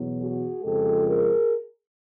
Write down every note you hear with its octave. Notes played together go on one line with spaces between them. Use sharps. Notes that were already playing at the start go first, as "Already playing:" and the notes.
Already playing: E2 B2 F#3
F#4 G#4
F2 C#3 F3 G#3 G4 A4
G#4 A#4